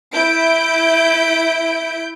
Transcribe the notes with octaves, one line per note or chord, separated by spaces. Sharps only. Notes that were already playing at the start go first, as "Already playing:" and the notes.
E4 G6 D7